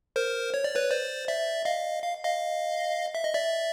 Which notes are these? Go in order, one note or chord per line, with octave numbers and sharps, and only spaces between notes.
A#4 C5
C#5
D5
B4 C#5
C5 D5
D5 E5
D#5 F5
F5
D#5 F5
E5
D#5
D5 E5